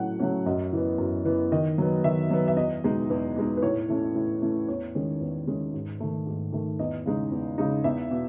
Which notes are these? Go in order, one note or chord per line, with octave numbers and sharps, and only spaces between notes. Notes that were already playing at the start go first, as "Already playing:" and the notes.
Already playing: A2 F#3 A3 C#4 F#5
F#3 A3 C#4
F#2 D#5
E3 B3
F#2
E3 B3
D#3 D#5
F#3 B3
D#3 E5
F#3 B3
E5
E2 D#5
B2 G#3 D#4
E2 B4
B2 G#3 D#4
B4
A2 C#5
E3 A3 C#4
A2
E3 A3 C#4
E2 C#5
D#3 G#3 C#4
E2
D#3 G#3 C#4
G#2
D#3 A3
G#2
D#3 A3
E2 D#5
C#3 G#3 D#4
E2
C#3 G#3 D#4
E2 E5
B2